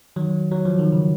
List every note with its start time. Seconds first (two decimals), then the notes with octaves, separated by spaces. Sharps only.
0.16 D#3 F#3
0.52 F#3
0.65 F3
0.79 D#3
0.92 C#3